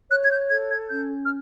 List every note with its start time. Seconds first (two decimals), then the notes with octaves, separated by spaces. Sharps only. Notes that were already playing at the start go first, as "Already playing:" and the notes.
0.11 C#5 F#6
0.25 G#6
0.30 G6
0.49 A4 G#6
0.70 G#6
0.89 C#4 G6
1.25 F6